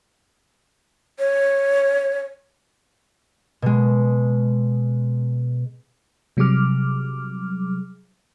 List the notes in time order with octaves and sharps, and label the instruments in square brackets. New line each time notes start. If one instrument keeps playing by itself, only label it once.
[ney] C#5
[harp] B2 G#3
[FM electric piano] C3 F#3 G3 G#4 D6 F6